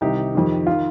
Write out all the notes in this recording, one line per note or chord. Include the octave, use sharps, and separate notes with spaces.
C2 C3 D#3 D#4 G4
F2 D#3
D#3 F4